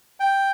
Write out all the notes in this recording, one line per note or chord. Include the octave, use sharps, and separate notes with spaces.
G5